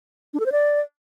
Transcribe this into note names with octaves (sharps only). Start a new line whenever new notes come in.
D4
A4
C5
D5